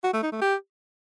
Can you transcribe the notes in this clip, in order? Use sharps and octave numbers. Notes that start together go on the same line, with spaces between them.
F#4
A3
D#4
A3
G4